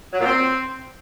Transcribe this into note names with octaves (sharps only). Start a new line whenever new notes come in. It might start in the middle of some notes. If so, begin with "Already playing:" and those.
F#3
A#2
C4